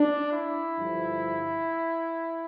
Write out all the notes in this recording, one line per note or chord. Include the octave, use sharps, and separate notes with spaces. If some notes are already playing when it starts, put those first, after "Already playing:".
Already playing: D4
E4
G2 D3 F3